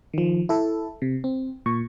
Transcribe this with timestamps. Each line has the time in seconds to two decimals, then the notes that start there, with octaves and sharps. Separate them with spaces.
0.14 D#3 F3
0.49 E4 A4
1.02 C3
1.24 C4
1.66 A#2 C#6